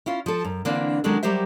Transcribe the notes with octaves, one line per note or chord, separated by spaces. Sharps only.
C#4 E4 F4
F3 A4
F#2
D3 E3 A#3 C4 D4
D#3 F#3 G#3 C#4 D4 A4
F#3 G3 G4 A#4 C5 E5